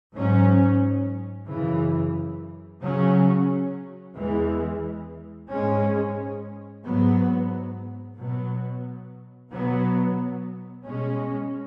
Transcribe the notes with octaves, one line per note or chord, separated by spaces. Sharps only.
G#2 F#3 C#4
F#2 C#3 E3
C#3 F#3 C#4
E2 E3 G#3
G#2 G#3 C#4
G#2 F#3 B3
B2 F#3 B3
B2 F#3 B3
B2 G#3 C#4